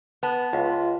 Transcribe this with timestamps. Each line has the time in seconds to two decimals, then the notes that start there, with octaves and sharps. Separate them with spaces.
0.23 B3 B4 A5
0.53 C#2 F4